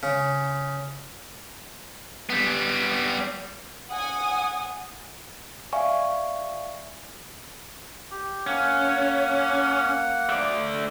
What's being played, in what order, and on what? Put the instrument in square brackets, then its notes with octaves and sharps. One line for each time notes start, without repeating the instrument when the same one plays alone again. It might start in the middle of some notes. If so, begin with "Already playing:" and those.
[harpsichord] C#3
[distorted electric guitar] G3 B3
[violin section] F#5 G#5 D#6
[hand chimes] D5 E5 F5 G#5 C#6
[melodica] G4
[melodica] A#3 F#5 [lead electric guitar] C#4
[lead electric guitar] A3 D5